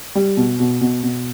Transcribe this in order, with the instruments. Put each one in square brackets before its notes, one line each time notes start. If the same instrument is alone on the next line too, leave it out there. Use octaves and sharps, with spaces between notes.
[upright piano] G3
B2
B2
B2
B2